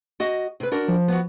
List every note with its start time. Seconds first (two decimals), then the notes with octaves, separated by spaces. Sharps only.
0.20 F#4 D#5
0.60 C3 B4
0.72 D4 F#4 A#4
0.88 F3
1.08 B3 F#4